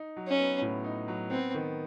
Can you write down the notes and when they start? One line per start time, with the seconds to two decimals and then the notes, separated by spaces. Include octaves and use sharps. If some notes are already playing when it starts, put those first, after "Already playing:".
Already playing: D#4
0.16 F#3
0.27 C#4
0.39 B3
0.62 A2
0.84 D#4
1.08 F#3
1.31 B3 C4
1.54 D#3